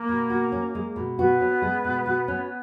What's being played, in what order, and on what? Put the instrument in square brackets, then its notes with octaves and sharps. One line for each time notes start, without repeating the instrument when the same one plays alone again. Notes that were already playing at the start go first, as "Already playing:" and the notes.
Already playing: [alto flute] A#3
[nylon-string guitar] B2
F#4
C#4
G#3
B2
[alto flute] B3 [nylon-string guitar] F#4
[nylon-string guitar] C#4
G#3
B2
F#4
C#4